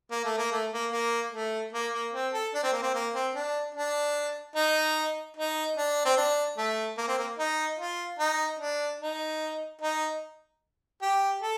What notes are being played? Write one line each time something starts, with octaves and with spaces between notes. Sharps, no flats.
A#3
A3
A#3
A3
A#3
A#3
A3
A#3
A#3
C4
A4
D4
C4
A#3
C4
A#3
C4
D4
D4
D#4
D#4
D4
C4
D4
A3
A#3
C4
A#3
D#4
F4
D#4
D4
D#4
D#4
G4
A4